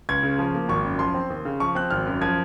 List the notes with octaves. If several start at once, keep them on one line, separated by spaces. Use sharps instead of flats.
C#2 G#6
C#3
F3
A#3
G#1 C#6
F#2
F3 C6
C4
D#2
C#3
F3 C#6
C4 F#6
G#1 F6
F#2
F3 G#6